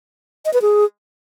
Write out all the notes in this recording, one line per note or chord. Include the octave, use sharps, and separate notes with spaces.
D#5
B4
G#4